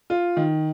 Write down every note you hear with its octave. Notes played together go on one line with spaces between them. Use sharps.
F4
D#3